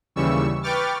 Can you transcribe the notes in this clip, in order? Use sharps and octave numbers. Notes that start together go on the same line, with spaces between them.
D#2 C#3 E3 G3 C#6 E6
B4 G5 C#6 D6 F6 A6